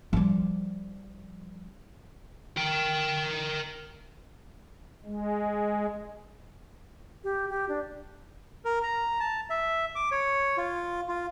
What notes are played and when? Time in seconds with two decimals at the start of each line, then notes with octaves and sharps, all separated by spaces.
0.13 F3 G3
2.57 A#4 G5
5.05 G#3
7.24 G4
7.49 G4
7.69 D4
8.65 A#4
8.83 A#5
9.20 A5
9.50 E5
9.95 D6
10.12 C#5
10.57 F4
11.08 F4